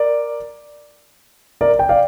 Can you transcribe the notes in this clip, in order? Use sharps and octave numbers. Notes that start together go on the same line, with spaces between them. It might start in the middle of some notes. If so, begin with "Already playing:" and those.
Already playing: A#4 D5
A#4 D5
G5
D5 F5